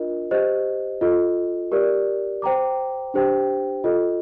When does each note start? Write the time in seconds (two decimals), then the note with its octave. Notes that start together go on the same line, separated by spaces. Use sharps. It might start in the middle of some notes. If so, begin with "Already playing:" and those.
Already playing: D4 F4 A#4 D#5
0.31 G4 C5 D#5
1.01 F4 A4 D#5
1.72 G4 A#4 D5
2.42 C5 G5 A#5 D6
3.14 D4 G4 C5 G5
3.84 F4 A4 D#5